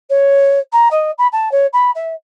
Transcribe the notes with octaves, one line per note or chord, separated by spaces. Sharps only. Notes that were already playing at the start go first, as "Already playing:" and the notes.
C#5
A#5
D#5
B5
A5
C#5
B5
E5